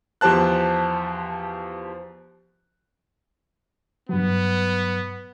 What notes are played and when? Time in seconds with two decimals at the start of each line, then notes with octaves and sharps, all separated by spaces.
0.21 E2 F3 G4 C5 A5 F#6
4.09 G2 F#3 B3